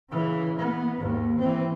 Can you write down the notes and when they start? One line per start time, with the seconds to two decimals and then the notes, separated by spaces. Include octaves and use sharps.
0.10 C#3 E3
0.60 B3
0.99 D#2 G#2
1.39 E3 C4